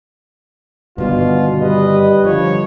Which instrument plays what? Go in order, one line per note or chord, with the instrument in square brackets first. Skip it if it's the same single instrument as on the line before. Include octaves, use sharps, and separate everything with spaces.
[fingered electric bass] G2 D3 D#3 [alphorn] B2 [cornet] F4 [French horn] F#4
[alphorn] G3 [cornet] B4 [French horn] D#5
[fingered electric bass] D3 [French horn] F3 [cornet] C#5